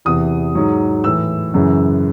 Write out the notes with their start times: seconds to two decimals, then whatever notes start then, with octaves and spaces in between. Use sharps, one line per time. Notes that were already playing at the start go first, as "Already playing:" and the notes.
0.05 E2 C3 E3 D#6
0.55 G#2 F#3
1.04 A2 E3 E6
1.54 F#2 C#3 E3